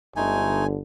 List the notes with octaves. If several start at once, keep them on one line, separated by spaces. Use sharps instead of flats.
G1 D3 G#3 A3 D#4 G#5